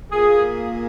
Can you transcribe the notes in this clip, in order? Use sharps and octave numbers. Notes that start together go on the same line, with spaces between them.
A#2 A#3 G#4